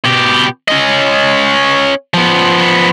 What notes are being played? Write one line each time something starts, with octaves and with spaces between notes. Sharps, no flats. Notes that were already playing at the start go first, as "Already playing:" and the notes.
B2 G4
C#4 D#5
F3 B3